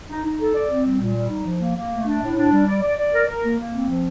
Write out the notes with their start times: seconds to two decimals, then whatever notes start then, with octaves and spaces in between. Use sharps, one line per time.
0.09 D#4
0.25 D#4
0.40 A4
0.55 D5
0.70 C4
0.86 G3
1.01 A#2
1.16 G3
1.30 D#4
1.46 F3
1.61 A#3
1.76 A#3
1.91 A3
2.06 D4
2.22 A2
2.37 D4
2.52 G3
2.67 D5
2.83 D5
2.98 D5
3.13 A#4
3.28 A#4
3.43 A#3
3.59 A#3
3.73 C4
3.89 F3